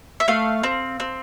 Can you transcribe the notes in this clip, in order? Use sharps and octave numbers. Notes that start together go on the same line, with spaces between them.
E5
A3 F5
C4
C4